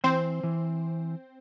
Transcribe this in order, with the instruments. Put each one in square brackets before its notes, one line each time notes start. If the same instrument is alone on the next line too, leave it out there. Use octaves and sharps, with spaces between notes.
[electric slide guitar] E3 [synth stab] C4 C5
[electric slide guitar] E3